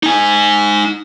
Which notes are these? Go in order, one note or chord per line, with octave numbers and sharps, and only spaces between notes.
D#4 G#5